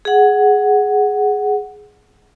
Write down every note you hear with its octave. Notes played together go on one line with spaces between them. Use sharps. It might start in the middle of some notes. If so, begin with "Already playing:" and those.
G#4 F#5